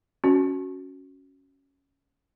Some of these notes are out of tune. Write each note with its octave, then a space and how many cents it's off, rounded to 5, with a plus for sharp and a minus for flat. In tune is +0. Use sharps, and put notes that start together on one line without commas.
C#4 +0 F#4 +0